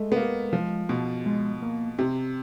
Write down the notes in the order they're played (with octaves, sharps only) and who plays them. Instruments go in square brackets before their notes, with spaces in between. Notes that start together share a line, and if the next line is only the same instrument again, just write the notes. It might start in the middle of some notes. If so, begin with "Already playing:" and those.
Already playing: [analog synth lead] G#3 [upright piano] A3
[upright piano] B3
A#3
F3
B2
[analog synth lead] G#3
A#3
[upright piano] C3